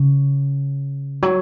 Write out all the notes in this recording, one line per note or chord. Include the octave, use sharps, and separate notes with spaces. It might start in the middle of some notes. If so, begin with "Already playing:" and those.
Already playing: C#3
F#3